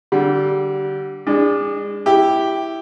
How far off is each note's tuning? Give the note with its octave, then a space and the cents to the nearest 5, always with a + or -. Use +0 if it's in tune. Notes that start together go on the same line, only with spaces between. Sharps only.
D3 +0 G3 -25
G#3 -30 D4 +0
E4 +0 G4 +0